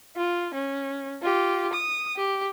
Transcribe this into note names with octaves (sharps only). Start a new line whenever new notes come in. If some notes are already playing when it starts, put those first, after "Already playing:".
F4
C#4
F4 G4
D#6
G4